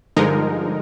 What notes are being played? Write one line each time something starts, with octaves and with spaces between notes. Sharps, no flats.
G2 D3 F3 G#3 D#4 A#4